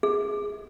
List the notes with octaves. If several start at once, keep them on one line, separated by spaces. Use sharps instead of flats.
G#4